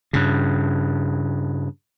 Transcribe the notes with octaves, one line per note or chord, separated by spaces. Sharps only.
G2 C#3